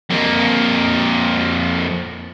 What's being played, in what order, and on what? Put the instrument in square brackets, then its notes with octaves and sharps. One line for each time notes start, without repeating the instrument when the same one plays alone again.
[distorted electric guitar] F2 A#3